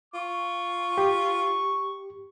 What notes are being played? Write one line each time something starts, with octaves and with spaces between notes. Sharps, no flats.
F4 C#6
G4